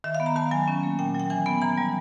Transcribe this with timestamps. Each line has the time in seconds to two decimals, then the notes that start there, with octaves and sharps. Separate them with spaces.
0.04 D#3 E5
0.15 F5
0.20 B3
0.26 A#5
0.36 D#3 A5
0.51 F#3 G#5
0.68 C#4
0.83 A#3
0.99 A#2 G5
1.15 F#3 G5
1.30 E3 G#5
1.46 B3 G#5
1.62 E3 A#5
1.77 G3